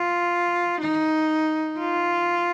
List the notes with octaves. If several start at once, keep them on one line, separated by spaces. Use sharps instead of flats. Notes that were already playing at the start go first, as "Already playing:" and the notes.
Already playing: F4
D#4
F4